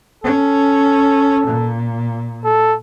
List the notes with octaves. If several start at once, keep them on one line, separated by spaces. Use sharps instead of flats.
C#4 A4
A#2
A4